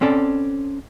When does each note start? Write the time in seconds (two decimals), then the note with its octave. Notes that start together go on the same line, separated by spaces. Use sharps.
0.01 C4 C#4 A4 D5